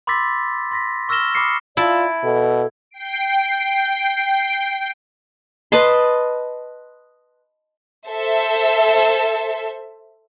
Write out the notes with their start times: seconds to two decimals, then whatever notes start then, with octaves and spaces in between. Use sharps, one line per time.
0.07 B5 C6 D6 E6 A6 B6
0.71 C6 A#6 B6
1.09 C#6 E6 F6 A#6 E7 G7
1.35 B5 D6 D#6 F6 C7 C#7
1.77 E4 F4 D5 A5
2.24 B2 A4
2.91 G5 C7 D7
5.72 B4 D#5 A5 C6
8.09 A4 C5 E5